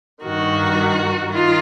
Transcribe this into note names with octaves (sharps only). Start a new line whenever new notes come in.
G2 D#3 F#4
D#3 F4